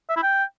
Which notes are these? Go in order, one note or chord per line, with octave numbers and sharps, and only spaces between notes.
E5
E4
G5